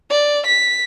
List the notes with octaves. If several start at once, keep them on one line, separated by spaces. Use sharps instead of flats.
D5
B6